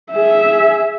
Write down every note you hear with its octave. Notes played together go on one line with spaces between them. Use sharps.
G#4 E5